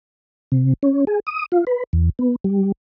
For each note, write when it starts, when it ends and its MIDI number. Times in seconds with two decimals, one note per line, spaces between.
0.52 0.73 48
0.83 1.05 61
1.07 1.20 68
1.27 1.46 87
1.52 1.64 65
1.67 1.84 71
1.93 2.10 40
2.19 2.36 59
2.44 2.72 55